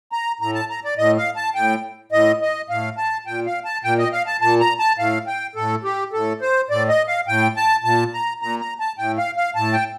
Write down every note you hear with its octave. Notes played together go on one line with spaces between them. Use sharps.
A#5
A2 A#5
A5
A#5
D5
A2 D#5
F5
A5
A2 G5
A2 D#5
D#5
A2 F5
A5
A#2 G5
F5
A5
A#2 G5
D#5
F5
A5
A#2 A5
A#5
A5
A2 F5
G5
A2 A4
G4
A2 A4
C5
A2 D5
D#5
F5
A2 G5
A5
A#2 A5
A#5
A#2 A#5
A#5
A5
A2 G5
F5
F5
A2 A5
G5